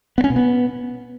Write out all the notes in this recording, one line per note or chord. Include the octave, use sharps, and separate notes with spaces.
B3
C#4
B2
B3